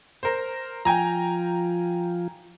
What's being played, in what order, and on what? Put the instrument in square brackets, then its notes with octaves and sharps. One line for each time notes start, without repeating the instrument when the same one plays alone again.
[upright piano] A#4 C5
[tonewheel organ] F3 F4 [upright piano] G5 G#5 A#5